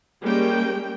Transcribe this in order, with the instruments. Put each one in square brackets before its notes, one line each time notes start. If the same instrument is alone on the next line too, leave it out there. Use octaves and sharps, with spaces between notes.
[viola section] G3 G#3 A#3 C#4 G5